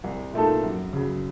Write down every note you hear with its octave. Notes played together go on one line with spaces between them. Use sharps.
C2
A#2 A3 D#4 A4
F#2
C#3 F#3